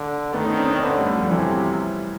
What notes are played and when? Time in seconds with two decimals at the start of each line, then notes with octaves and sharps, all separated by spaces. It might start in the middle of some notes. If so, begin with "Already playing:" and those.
Already playing: D3
0.33 D#3 A3 B3
0.45 C#4 D#4
0.57 C4 D4
0.70 C4 D4
0.82 D3 B3 C#4
0.98 G3 A3
1.16 F3 G3
1.31 C3 E3 F#3